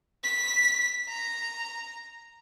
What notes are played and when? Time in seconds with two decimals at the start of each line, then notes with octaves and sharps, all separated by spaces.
0.24 B6
1.09 A#5